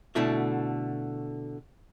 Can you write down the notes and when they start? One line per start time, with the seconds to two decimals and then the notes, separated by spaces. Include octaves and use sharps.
0.15 B2 D3 A3 E4 F#4